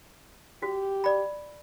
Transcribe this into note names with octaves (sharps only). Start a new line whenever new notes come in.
F#4 G4
D5 B5